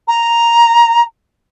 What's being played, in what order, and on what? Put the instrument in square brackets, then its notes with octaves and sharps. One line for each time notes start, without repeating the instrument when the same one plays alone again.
[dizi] A#5